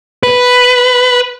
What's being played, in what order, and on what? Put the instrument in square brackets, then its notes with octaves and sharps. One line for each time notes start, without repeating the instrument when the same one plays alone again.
[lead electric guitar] B4